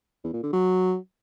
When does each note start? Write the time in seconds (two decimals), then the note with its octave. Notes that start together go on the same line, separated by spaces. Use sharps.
0.24 E2
0.34 A#2
0.43 D3
0.53 F#3